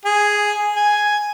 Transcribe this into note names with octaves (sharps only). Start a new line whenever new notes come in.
G#4
G#5